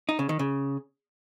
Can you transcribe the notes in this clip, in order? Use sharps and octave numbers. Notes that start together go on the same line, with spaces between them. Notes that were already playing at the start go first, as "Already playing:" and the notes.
D#4
C#3
D#3
C#3